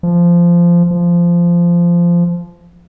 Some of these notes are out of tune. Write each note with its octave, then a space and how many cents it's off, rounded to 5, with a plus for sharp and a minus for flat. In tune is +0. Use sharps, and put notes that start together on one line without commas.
F3 -15
F3 -15